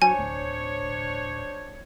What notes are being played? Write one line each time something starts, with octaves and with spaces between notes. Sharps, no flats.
F#3 D4 C5 C#5 G#5
D1